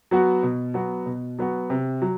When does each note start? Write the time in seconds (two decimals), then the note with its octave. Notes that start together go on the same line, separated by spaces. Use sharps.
0.11 F#3 B3 F#4
0.43 B2
0.74 F#3 B3 F#4
1.06 B2
1.39 F#3 B3 F#4
1.70 C3
2.02 F#3